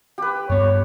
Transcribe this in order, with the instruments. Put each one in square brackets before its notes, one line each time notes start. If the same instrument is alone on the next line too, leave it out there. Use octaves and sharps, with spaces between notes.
[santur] G4 B4
[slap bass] G2 B3 [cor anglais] C#5